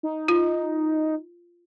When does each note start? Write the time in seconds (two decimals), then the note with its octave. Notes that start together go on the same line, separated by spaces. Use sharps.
0.03 D#4
0.28 F4